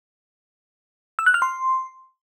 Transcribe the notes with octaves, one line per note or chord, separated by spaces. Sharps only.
E6
F#6
F6
C6